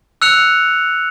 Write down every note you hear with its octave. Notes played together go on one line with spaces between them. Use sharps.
E6 F#6 C#7 F7